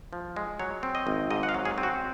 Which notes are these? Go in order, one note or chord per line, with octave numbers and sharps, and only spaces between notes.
F3
G#3
F#3 C#5
C4
D#5
G#1
G#2 D#5
F#5
F5
F#3
G#4
C4
F#4